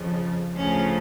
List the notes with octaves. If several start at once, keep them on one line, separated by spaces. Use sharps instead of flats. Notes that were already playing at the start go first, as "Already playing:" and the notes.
Already playing: F2 C#3 F3
D2 C#3 F3 C#4